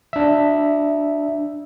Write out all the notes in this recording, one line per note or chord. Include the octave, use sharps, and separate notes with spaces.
D4 E5